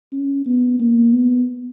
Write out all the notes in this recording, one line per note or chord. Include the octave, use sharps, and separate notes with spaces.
C#4
B3
A#3
B3